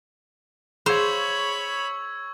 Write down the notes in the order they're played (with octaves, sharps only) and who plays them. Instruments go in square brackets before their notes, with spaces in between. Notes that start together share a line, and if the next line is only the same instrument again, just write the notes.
[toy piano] G#4 F5 [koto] C5 [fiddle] C#5 B5 [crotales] C#6 E6 G#6